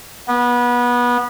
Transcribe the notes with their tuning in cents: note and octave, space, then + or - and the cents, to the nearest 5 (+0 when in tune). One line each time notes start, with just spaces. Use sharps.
B3 -25